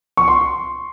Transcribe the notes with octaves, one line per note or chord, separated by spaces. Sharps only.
C#6
C6